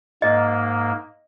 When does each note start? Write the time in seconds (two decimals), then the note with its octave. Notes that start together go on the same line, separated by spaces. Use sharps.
0.22 G#2 A#3 D#5